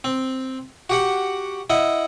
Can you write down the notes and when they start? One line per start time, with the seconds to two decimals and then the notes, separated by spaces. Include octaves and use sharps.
0.04 C4
0.90 F#4 G4 F#5
1.70 E4 D#5 F#5